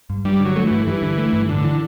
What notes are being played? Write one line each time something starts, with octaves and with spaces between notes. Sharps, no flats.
G2
G2 G3
D3
F#3
A3
G2 E3
G2 E3
D3
A3
G2
A2 D3
E3